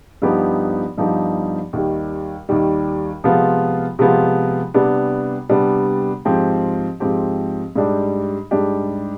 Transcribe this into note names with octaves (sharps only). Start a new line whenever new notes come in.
G2 F3 B3 D#4 G4
G2 F3 B3 D#4 G4
D#2 D#3 G3
D#2 D#3 G3
C3 F3 G#3 B3 F4
C3 F3 G#3 B3 F4
C3 G3 B3 D4
C3 G3 B3 D4
G#2 F3 C4 G4
G#2 F3 C4 G4
G#2 G3 D4 G4
G#2 G3 D4 G4